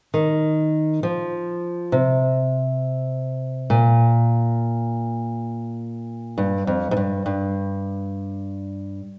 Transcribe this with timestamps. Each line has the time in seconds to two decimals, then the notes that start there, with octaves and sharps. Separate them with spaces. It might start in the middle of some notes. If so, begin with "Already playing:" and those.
0.14 D#3
1.03 F3
1.92 C3
3.70 A#2
6.38 G2
6.67 F2
6.91 G#2
6.97 G2
7.26 G2